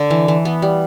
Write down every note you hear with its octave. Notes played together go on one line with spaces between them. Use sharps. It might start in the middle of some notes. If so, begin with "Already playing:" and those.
Already playing: D3
E3
E3
B3
G3